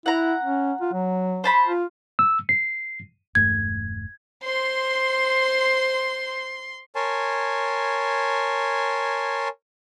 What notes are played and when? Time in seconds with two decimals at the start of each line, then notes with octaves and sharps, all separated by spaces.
0.06 E4 F#5 A#5
0.43 C#4
0.81 F4
0.93 F#3
1.44 C5 A5 B5
1.67 F4
2.19 E6
2.49 C7
3.35 E1 G2 A3 G#6
4.44 C5 C6
6.95 A#4 C#5 G#5 A5 C6